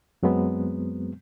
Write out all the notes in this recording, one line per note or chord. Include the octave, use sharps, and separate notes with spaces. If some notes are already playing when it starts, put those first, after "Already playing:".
F#2 F#3 G#3 B3 C4